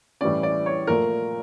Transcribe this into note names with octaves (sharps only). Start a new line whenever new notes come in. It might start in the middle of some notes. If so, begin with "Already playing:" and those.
A2 E3 G3 C#4 D5
D5
C#5
A#2 F3 A3 A#4